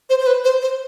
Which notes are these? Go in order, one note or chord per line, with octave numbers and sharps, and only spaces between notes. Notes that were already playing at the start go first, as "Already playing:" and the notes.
C5
C5
B4
C5
C5